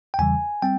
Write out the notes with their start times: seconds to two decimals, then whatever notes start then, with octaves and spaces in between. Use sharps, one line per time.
0.14 G5
0.19 E2 C#3 E3 G3 G#5
0.62 G3 C4 G5